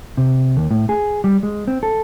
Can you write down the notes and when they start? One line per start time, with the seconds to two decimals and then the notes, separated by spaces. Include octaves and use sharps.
0.17 C3
0.57 D#2
0.71 A2
0.89 G#4
1.24 G3
1.43 G#3
1.67 C4
1.83 A4